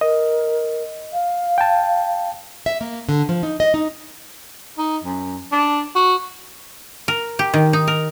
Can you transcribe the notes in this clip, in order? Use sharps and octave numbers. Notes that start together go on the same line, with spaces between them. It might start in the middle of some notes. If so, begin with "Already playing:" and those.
A#4 D#5
F5
G5 A5
E5
A#3
D3
F3
D#4
D#5
D#4
D#4
F#2
D4
F#4
A#4
G4
D#3
D#4
A#4